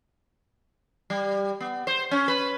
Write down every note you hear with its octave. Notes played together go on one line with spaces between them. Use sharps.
G3
B3
C5
C#4
B4